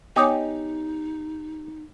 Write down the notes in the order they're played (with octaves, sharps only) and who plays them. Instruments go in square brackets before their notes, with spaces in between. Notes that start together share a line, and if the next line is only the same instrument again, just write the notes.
[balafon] B3 C#5 G#5 [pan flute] D#4 [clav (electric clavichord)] G4 D#5